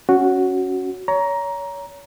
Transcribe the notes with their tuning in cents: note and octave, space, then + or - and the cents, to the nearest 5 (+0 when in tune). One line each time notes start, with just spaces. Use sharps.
C#4 +0 F#4 +0
C#5 +30 A#5 +10